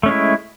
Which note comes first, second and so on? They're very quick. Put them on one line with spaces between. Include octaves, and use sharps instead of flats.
A3 C#4 G#3 E4